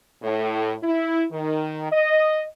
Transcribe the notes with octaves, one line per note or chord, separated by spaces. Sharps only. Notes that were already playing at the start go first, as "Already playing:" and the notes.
A2
E4
D#3
D#5